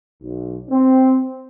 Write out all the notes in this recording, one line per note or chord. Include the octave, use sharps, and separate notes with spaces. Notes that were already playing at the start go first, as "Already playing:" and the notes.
B1
C4